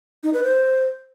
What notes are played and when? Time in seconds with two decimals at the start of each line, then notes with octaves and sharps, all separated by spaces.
0.23 D#4
0.34 B4
0.44 C5